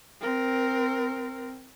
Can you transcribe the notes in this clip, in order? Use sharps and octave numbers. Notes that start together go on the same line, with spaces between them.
C4 A#4